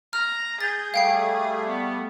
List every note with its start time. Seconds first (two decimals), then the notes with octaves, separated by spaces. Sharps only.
0.13 A#5 F6
0.61 G#4 G6 A6
0.94 G3 A3 F5 G5 C7
1.67 B3